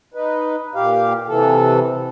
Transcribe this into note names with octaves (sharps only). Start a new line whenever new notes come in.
D#4 B4
A#2 G4 F5
C3 E3 A4